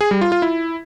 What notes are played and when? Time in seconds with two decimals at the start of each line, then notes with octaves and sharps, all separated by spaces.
0.01 G#4
0.11 G3
0.21 F4
0.32 F4
0.42 E4